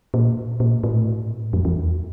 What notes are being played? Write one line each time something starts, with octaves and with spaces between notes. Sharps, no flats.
A#2
A#2
A2
F2
E2